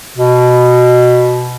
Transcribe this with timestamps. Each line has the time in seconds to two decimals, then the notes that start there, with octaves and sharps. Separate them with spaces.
0.17 B2